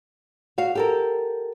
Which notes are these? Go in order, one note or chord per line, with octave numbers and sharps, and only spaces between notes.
F#4 F5
G4 A4 A#4